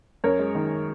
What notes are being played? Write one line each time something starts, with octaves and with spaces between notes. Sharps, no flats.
F#2 A#4 C#5
G#3
D#3